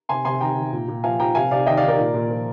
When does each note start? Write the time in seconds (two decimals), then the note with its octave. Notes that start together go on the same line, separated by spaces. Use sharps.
0.09 C3 G#5 C6
0.25 C3 G#5 C6
0.41 D#3 G5 A#5
0.57 D#3
0.73 A#2
0.88 A#2
1.04 F3 F5 G#5
1.19 F3 G5 A#5
1.35 C3 F5 G#5
1.51 C3 D5 F5
1.66 D#3 D#5 G5
1.77 D5 F5
1.83 D#3
1.88 A#4 D5
1.98 A#2
2.14 A#2
2.30 F3